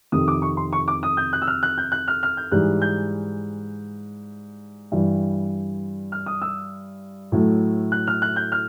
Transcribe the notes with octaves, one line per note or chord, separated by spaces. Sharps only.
F2 C3 D#3 D#6
D6
C#6
C6
C#6
D6
D#6
G6
F#6
E6
F6
F#6
G6
F#6
F6
F6
G6
G#2 E3 G3 F#6
G6
G2 E3 G3
F6
D#6
E6
A2 F#3 A3
F#6
F6
F#6
G6
F6